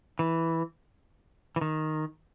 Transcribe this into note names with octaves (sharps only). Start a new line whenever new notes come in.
E3
E3
D#3